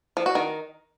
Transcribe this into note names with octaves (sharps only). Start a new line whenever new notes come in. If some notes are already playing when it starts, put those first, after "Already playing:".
F3
F#4
D#3